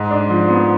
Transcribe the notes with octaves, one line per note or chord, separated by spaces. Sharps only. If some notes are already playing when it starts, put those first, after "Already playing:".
Already playing: G#2
D4
F3
B3